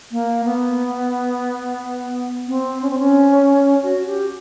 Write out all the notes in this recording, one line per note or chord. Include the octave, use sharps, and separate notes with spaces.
A#3
B3
C4
C#4
C4
C#4
F#4
G4